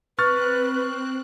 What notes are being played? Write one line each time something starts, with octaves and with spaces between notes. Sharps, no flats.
C4 B4 C#6 F6 F#6 A6